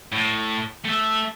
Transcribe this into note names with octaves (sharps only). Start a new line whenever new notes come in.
A2
A3 E5